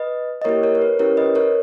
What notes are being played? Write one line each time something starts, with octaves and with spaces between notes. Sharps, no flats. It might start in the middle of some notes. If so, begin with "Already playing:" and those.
Already playing: B4 D#5
D#5
A#3 E4 G4 A#4 C#5
A#4 C#5
A#4
B4
C#4 E4 G4 A#4 C#5
B4 D#5
A#4 C#5